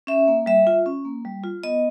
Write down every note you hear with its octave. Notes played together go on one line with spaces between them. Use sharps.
C#4 E5
A#3
G3 E5
F4
C#4
A#3
G3
F4
B3 D#5